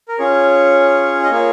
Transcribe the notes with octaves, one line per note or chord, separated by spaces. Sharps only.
A#4
C#4 F4 G#4 C#5
D#5
A#3 F4 G#4 C#5